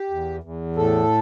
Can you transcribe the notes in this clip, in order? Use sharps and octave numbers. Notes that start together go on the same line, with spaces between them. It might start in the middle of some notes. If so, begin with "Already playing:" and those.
Already playing: G4
E2
E2
A2 A4